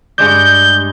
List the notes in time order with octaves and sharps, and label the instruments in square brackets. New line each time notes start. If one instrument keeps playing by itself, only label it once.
[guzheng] G2 G#3 D5 [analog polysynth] G6